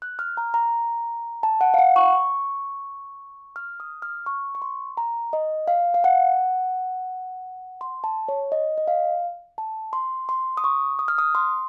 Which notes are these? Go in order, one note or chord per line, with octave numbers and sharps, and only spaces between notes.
F#6
F6
A#5
A#5
A5
F#5
F5
F#5
C#6
F6
D#6
F6
C#6
C#6
C6
A#5
D#5
F5
F5
F#5
C6
A5
C#5
D#5
D#5
F5
A5
C6
C6
D#6
C#6
D#6
F6
D#6
C6